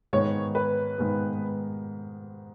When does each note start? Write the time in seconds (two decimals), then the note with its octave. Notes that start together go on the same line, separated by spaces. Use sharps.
0.13 G#2 D#3 G#3 B3 C#5
0.55 B4
0.98 G#2 D#3 G#3 B3